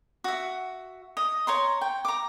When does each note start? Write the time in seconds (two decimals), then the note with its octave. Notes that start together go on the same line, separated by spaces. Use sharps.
0.24 F#4 E5
1.17 D#5
1.47 C#5 A#5 C6
1.81 G5
2.05 A#5 D6